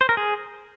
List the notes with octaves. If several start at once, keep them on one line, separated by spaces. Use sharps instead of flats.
C5
A#4
G#4